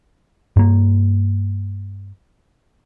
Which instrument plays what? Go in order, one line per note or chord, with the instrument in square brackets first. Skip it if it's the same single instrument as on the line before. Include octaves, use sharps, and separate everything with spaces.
[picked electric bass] G2 A#3